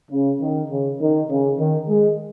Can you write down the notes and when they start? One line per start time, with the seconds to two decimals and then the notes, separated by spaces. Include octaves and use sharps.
0.11 C#3
0.41 D#3
0.70 C#3
1.00 D#3
1.29 C#3
1.58 D#3
1.88 G#3